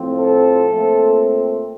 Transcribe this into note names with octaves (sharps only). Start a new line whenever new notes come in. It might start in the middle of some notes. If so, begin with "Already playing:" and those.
Already playing: A2 F3 C4
A4
A#2 A3 C4